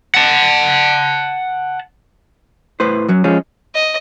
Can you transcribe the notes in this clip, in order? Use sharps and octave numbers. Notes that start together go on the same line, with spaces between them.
F#5 A5
A2 B4 C5
F#2 F#3
F3 G#3 C#4
D#5